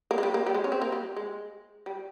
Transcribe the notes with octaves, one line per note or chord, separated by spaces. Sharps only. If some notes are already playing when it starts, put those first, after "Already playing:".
A#3
G#3
G3
A#3
G3
G#3
C#4
C4
A#3
G3
G#3
G3